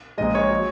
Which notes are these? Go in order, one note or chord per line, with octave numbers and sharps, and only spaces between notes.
A#1 A#2 G#3 D#5
C#5
F#3